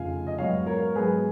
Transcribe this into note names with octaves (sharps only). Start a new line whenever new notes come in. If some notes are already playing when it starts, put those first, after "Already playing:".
Already playing: F1 F2 C#3 F5 G#5
D#5
G#2 F#3 B3 C#5 F5
A#4 C#5
G#2 F#3 B3 G#4 B4